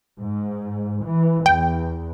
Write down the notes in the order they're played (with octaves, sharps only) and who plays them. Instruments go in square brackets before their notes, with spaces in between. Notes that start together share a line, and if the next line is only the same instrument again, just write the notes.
[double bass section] G#2
E3
[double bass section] E2 [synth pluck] G5